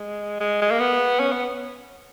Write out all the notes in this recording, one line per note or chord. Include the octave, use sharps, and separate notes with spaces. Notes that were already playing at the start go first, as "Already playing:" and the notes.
Already playing: G#3
G#3
G#3
A#3
B3
C#4
B3